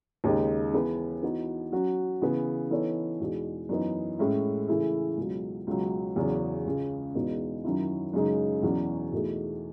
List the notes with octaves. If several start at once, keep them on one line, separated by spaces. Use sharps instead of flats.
D#2 C#3 G#3 D#4
E3 B3 E4 G#4 B4
E3 B3 D#4 F#4
F#3 C#4 F#4
C#3 E3 B3
E3 B3 D#4 A4 C#5
E2 B2 G#3 D#4 G#4
F#2 E3 B3 D#4
A2 G#3 C#4 E4
C#3 E3 A3 E4 G#4
C#2 B2 F#3
C#2 B2 F#3
E2 C#3 F#3 C#4
C#2 C#3 G#3
E2 B2 G#3 B3 D#4
F#2 D#3 F#3 C#4 E4
F#2 C#3 G#3 D#4
E2 B2 F#3 C#4
E2 B2 A3 D#4 G#4